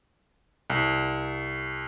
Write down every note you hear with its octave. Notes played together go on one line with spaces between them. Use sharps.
C2